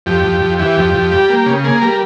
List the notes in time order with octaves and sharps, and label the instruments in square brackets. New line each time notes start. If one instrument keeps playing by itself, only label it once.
[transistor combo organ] F2 G4
F2
F2
E3 G4
F2
F2
G3
A#3
C#3
A#3 G#4
G3 A#4